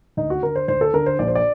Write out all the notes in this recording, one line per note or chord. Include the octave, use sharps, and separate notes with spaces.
D2 D#4
F#4
D3 A#4
C5
D2 C5
A4
D3 A#4
C5
A#1 D5
C5
D5